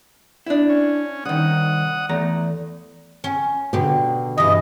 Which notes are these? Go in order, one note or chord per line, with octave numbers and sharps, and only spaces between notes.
D4 E4
C#4
C2 D#3 F#5 D#6
E2 A3 A#5
C#4
B2 D3 G4
G2 E3 D#5